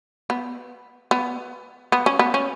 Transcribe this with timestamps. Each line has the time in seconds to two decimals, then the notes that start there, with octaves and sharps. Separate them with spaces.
0.30 B3
1.11 B3
1.92 B3
2.06 C#4
2.19 B3
2.34 C#4